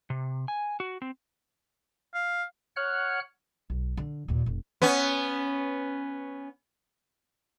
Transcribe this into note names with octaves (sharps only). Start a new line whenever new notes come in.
C3
G#5
F#4
C4
F5
C#5 F#5 F6 F#6
B1
D3
D#2 A#2
F1
B3 C#4